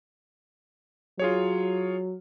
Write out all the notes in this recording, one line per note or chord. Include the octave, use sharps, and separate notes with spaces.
F#3 F4 G#4 C#5